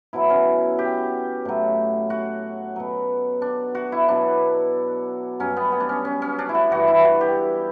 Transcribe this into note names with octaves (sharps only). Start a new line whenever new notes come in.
B2 F#3 E4
C#4
G4
A2 F#3
F#4
B2 F#3
D4
F#4
E4
B2 F#3 D4
G2 F#3 C#4
B3
B3
D4
C#4
C#4
C#4
D4
E4
F#4
G2 E3 F#4
E4
F#4
G4